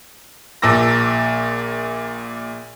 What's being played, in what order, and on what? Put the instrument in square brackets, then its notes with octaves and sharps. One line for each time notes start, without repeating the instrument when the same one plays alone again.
[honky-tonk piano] A#1 A#2 A5 D6 E6 A#6